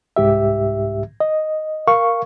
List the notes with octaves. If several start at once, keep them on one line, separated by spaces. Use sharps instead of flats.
C2 G#2 G4 E5
D#5
A#4 F5 C#6